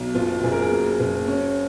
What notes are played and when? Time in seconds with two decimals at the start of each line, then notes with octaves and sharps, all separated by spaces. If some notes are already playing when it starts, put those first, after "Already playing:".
Already playing: B1
0.15 F#1 F4
0.44 F#1 G#4
0.52 A#4
0.62 G#4
0.71 A#3
1.00 F#1
1.27 C#4